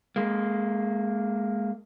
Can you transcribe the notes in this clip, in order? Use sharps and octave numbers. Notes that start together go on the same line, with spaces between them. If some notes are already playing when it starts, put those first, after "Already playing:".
G#3 A#3